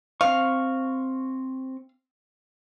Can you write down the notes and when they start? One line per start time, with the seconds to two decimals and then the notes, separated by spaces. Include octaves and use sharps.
0.21 C4 F5 C#6